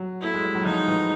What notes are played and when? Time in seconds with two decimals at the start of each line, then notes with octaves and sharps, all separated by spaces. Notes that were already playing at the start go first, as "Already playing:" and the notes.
Already playing: F#3
0.21 A3 E4
0.34 G#3
0.45 G3
0.55 F#3
0.65 F3 D#4
0.88 E3